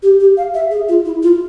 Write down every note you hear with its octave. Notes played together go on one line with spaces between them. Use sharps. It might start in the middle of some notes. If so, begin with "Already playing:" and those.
G4
G4
F5
E5
G#4
F4
E4
F4